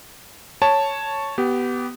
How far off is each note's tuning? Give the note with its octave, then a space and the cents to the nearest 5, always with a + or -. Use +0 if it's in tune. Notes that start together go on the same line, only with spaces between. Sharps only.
C#5 +0 A5 +0
B3 +0 G4 -20